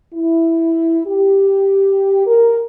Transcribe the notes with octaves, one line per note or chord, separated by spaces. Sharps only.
E4
G4
A#4